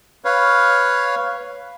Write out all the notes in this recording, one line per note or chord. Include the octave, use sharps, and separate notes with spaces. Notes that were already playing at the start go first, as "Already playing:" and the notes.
B4 C#5 F5